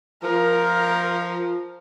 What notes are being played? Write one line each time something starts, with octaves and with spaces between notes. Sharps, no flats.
F3 A#4